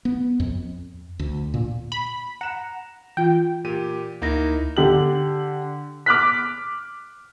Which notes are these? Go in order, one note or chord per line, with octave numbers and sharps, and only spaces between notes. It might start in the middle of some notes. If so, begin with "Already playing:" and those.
B3
F2
D2
A#2
B5
F#5 A#5 E7
E3 F4 G5
A#2 G4 D#7
D2 A#3 D#4 E4 A#6
D3 G4 F#7
D6 F6 F#6 B6